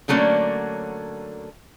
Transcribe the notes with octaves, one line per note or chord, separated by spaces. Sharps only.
D3 F#3 A3 A#3 C#4 D4